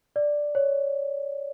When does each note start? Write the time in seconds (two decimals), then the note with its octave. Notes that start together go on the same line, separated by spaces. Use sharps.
0.16 D5
0.55 C#5